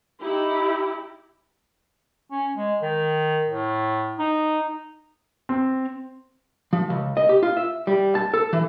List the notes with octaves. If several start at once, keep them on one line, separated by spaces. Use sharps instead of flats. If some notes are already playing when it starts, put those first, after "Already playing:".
D#4 E4 G4
C#4
G#3
D#3
A2
D#4
C4
F3
C#2
D#5
G4
F4
E5
G3
A5
A4
E3